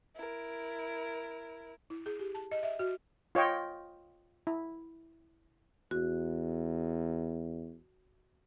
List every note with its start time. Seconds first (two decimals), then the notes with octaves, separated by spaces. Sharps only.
0.16 E4 A#4
1.90 E4
2.06 G#4
2.19 G4
2.35 A5
2.51 D#5
2.63 E5
2.79 F#4
3.35 F4 C#5 D#5 G5
4.47 E4
5.91 E2 F#4